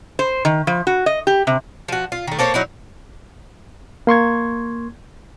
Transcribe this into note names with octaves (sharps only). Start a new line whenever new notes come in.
C5
D#3
F3
F#4
D#5
G4
C3
F3 F#4
F4
D#3 A3
A#3 A4 C5 C#5
F#3 D#4 E4
A#3 C6 C#6 G#6